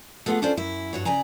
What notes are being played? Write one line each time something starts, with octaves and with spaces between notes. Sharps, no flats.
A3 B3 F4 G4 G#4 F#5
C#4 D4 F4 A4 C5 D5
F#2 E4
G2 F#4 C#5
C#3 D5 G#5 A#5